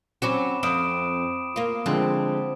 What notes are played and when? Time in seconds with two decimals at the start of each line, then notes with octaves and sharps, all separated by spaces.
0.22 F#3 C4 C#4 F#4 B5 D6 E7
0.63 F2 D#6 D7 E7
1.56 A#3 F4
1.86 D3 F3 G#3 C4